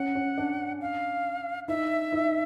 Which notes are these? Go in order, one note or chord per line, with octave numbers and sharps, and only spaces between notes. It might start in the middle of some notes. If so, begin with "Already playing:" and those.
Already playing: C#4 F#5
C#4
D4
F5
D#4 E5
D#4